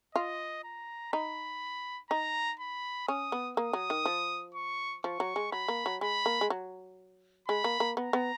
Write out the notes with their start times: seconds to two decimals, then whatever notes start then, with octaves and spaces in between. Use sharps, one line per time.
0.15 F4 D#5
0.64 A#5
1.13 D#4 B5
2.10 D#4 A#5
2.60 B5
3.08 C#4 D#6
3.32 B3
3.57 A#3 D#6
3.73 F#3
3.90 D#3
4.06 F3
4.54 C#6
5.04 F3 C#6
5.20 F#3
5.36 G#3
5.52 F#3 B5
5.68 A#3
5.86 F#3
6.01 G#3 B5
6.26 A#3
6.41 G#3
6.50 F#3
7.48 G#3 B5
7.64 A#3
7.80 A#3
7.97 B3 A#5
8.13 B3